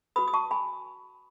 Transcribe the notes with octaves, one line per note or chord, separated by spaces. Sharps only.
F#4 B4 B5 D#6
D#6
A5 C#6
G#5 B5